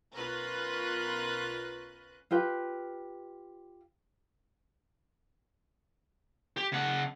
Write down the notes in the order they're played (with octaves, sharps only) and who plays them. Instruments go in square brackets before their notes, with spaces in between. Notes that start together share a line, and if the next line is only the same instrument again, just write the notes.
[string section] B1 C#4 F4 A#4 B4 F#6
[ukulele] F4 G4 B4 F5
[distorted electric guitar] G4
C#3 F#5